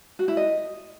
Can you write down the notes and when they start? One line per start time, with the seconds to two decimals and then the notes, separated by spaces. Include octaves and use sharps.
0.19 F#4
0.28 E4
0.37 D#5